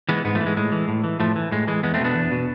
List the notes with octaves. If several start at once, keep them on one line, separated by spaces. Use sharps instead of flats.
E3 G#3 B3
G#2 G#3 B3
F3 A3
E3
G#3
A2 G#3
E3
A2
E3
A2 F3 A3
E3
A2 G#3
E3 G#3
E2 G#3 B3
A3 C4
B2 B3 D4
E2
B2